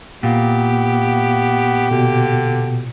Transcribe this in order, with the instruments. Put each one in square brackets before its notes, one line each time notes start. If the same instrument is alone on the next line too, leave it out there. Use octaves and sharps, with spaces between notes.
[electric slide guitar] A#2 [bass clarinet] B3 [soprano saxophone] G4
[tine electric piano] B2 [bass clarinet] D3